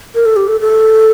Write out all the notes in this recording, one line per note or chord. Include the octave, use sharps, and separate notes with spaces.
A#4
A4
G4
A4
A4